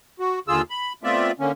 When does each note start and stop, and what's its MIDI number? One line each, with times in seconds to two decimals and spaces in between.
0.20 0.39 66
0.48 0.62 39
0.48 0.62 50
0.48 0.62 65
0.48 0.62 68
0.48 0.62 88
0.70 0.93 83
1.03 1.32 57
1.03 1.32 59
1.03 1.32 60
1.03 1.32 65
1.03 1.32 74
1.03 1.32 76
1.40 1.52 50
1.40 1.52 58
1.40 1.52 61